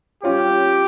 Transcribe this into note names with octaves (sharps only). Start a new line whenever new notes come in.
G3 C#4 F4 G4 C#5